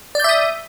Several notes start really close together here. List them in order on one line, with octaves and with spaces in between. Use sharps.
D5 G6 E5 D#6